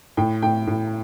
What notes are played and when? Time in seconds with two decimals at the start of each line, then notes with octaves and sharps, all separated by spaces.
0.17 A2 G5
0.42 A2 G5
0.67 A2